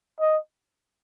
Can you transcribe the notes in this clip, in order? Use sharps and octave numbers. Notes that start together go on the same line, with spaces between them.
D#5